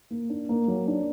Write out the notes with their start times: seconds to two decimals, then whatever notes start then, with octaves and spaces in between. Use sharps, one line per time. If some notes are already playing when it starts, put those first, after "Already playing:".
0.11 A#3
0.30 D4
0.49 A#3
0.68 F#3
0.87 D4